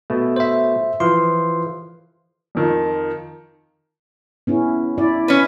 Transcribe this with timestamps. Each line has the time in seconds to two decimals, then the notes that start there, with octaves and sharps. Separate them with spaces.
0.10 B2 A3
0.36 C5 E5
1.00 E3 F3 C6
2.55 F2 D#3 F3
4.47 B3 C#4 E4
4.98 E4 D5
5.28 C#4 B4